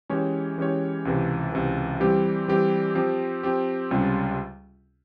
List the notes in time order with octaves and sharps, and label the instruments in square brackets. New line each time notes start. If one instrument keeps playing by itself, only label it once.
[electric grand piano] E3 G#3 C#4 G4 C#5
E3 G#3 C#4 G4 C#5
C#2 C3 E3
C#2 C3 E3
E3 G3 C4 G4
E3 G3 C4 G4
F3 C4 G4
F3 C4 G4
C#2 C3 G3 C#4 F4